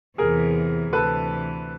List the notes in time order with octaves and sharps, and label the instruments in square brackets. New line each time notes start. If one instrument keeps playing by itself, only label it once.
[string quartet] E2 C3 E3 [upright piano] G#4 A#4
[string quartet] D2 C3 E3 [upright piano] A4 B4